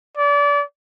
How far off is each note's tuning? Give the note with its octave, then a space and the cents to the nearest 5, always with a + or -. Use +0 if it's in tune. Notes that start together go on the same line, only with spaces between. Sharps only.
D5 -30